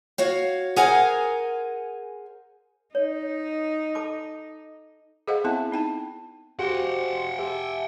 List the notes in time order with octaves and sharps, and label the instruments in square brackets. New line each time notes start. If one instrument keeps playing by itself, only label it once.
[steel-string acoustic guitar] F#4 C#5 F5
G#4 A#4 C5 F5 F#5 G#5
[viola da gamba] D#4 [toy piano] C#5
[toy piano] A4 A5 D6
[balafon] G#4 A4 C5 D#5 F5 F#5
B3 C4 E4 E5 A5
D#4 G5 A5
[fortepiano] F#4 G4 [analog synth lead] C5 [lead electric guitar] F#5 G5
[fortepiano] G4 [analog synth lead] E5